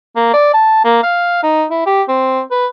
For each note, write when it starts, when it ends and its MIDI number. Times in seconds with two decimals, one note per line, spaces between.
0.16 0.30 58
0.33 0.51 74
0.54 0.80 81
0.85 0.99 58
1.03 1.40 77
1.43 1.64 63
1.71 1.82 64
1.86 2.03 67
2.09 2.42 60
2.51 2.67 71